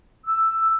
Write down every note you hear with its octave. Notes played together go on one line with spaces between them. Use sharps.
E6